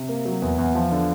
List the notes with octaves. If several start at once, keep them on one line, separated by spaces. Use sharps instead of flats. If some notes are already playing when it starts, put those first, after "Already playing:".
Already playing: C3
A#3
F#3
E2
E2
F3
D3